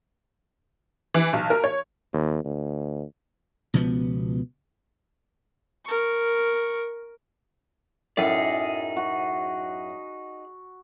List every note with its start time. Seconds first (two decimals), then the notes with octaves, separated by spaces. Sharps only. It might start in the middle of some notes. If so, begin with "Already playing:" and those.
1.14 E3
1.33 B1
1.50 A#4
1.64 C#5
2.13 D#2
2.45 D2
3.74 C#2 B2 F3 B3
5.85 A#4 C#6
8.17 F#2 A2 D#4 G#4 D5
8.96 F#4